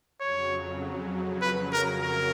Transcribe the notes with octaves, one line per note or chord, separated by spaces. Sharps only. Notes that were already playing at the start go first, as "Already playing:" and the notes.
F2 C#3 F#3 C#5
B4
A#4
A#4